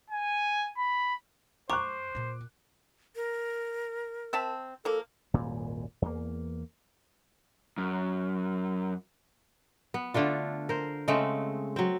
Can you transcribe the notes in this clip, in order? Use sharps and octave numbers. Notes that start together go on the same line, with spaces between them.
G#5
B5
F#2 C5 A#5 C#6 D6 F#6
A#2 F4
A#4
C4 E5 A5
F3 A#3 A4
D#1 G#1 F#2 A#2
E2 A#3
F#2
B3
D3 A3 D4 F4
A#4 C5
C#3 G#3 A3 C4
F#3 C4